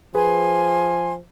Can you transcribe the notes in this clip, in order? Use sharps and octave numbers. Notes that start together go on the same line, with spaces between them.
F3 G#4 B4 G#5 C6